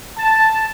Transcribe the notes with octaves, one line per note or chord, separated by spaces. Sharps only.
A5